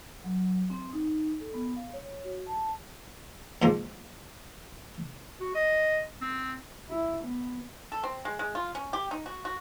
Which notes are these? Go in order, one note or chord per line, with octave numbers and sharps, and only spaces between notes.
F#3
C4
D#4
A4
B3
F5
C#5
F#4
A5
G#2 F3 A#3
F#4
D#5
C4
E4
B3
A4
C4
G#3
G#3
F4
C#4
G4
D#4
F#4
F#4